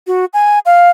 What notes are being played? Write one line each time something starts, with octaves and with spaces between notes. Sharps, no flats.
F#4
G#5
F5